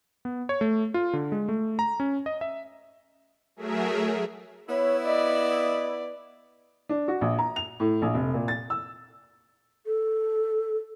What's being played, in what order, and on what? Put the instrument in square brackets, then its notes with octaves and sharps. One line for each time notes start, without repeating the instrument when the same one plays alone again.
[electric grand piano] B3
C#5
A3
F4
D3
G#3
A3
A#5
C#4
D#5
E5
[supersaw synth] F#3 A3 G#4 A#4 E5
[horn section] B3 E4 [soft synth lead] C#5
[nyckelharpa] D5 [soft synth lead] D#5
[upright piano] D4
F#4
A#1
A#5
F7
A2
A#1
F1
A#2
A6
E6
[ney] A4